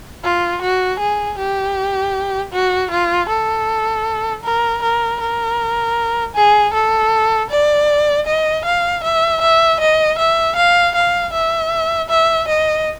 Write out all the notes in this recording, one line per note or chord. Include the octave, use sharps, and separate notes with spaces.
F4
F#4
G#4
G4
F#4
F4
A4
A#4
A#4
A#4
G#4
A4
D5
D#5
F5
E5
E5
D#5
E5
F5
F5
E5
E5
D#5